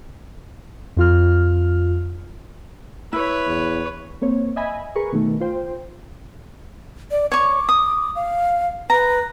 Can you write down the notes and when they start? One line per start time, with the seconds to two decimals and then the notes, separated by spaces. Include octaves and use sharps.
0.96 F2 F4 F6
3.13 E4 B4 C#5
3.47 E2
4.22 A#3 C4 C#5
4.56 D#5 E5 G#5 B5
4.95 G#4 A#4 B4 C#6
5.12 B2 D#3 A3
5.40 F4 C5 G5
7.11 D5
7.32 C#5 C#6 D6
7.69 D#6
8.16 F5
8.90 B4 A#5